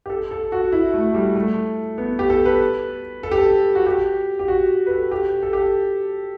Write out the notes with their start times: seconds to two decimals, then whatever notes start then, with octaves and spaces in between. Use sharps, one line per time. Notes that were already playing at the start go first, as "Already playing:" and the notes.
0.06 G4
0.10 A4
0.31 A4
0.52 F#4
0.72 E4
0.94 A3
1.14 G3
1.35 A3
1.98 B3
2.19 G4
2.30 A4
2.46 B4
3.23 A4
3.32 G4
3.38 A4
3.75 F#4
3.87 G4
4.39 G4
4.48 F#4
4.86 B4
4.91 A4
5.11 G4
5.43 A4
5.53 G4